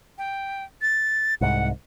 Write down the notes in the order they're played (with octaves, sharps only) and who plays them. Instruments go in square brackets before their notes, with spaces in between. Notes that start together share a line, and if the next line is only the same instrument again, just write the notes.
[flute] G5
A6
[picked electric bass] C2 G#2 [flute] F#5